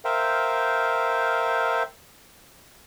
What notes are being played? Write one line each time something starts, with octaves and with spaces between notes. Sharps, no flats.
A#4 C5 E5 F5 G5